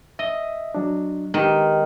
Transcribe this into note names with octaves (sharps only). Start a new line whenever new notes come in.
D#5 E5
F#3 D4
D#3 G#3 B3 G4